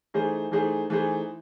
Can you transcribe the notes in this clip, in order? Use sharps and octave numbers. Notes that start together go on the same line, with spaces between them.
E3 A3 D#4 G#4 C5
E3 A3 D#4 G#4 C5
E3 A3 D#4 G#4 C5